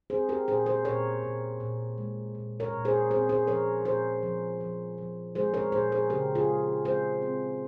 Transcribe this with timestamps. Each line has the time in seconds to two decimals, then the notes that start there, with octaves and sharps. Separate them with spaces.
0.10 C4 G#4 C5
0.29 G4 A#4
0.48 A#2 G#4 C5
0.66 G#4 C5
0.85 A#2 A#4 C#5
1.23 A#2
1.60 A#2
1.98 G#3
2.35 A#2
2.60 A#4 C#5
2.73 A#2
2.85 G#4 C5
3.10 C4 G#4 C5
3.29 G#4 C5
3.47 F3 A#4 C#5
3.85 A#2 G#4 C5
4.23 F3
4.61 F3
4.98 F3
5.35 G#3 G#4 C5
5.54 A#4 C#5
5.72 A#2 G#4 C5
5.92 G#4 C5
6.10 C#3 G4 A#4
6.35 F4 G#4
6.48 G#3
6.85 G#3 G#4 C5
7.22 C4